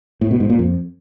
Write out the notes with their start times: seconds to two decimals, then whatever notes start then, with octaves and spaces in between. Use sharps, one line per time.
0.21 A2
0.31 B2
0.40 G#2
0.50 A#2
0.59 F2